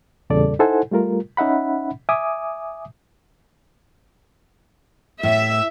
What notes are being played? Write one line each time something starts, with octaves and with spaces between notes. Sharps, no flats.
E2 A#2 C#3 G3 A4 D5
D#4 E4 A4 C5 F#5 G#5
G3 A3 F4 A#4
C#4 D#4 E5 F#5 B5
E5 G#5 D6 D#6
A2 E5